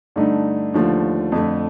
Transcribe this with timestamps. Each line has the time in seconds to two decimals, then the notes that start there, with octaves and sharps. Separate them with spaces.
0.16 G2 D3 A3 D#4
0.74 D#2 D3 F3 A3
1.32 F2 D3 A3